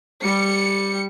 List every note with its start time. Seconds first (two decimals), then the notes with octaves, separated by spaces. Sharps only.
0.21 G3 C#7